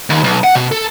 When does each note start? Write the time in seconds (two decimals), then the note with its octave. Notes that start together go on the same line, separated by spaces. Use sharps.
0.10 D#2
0.24 B1
0.44 F#5
0.55 B2
0.72 A4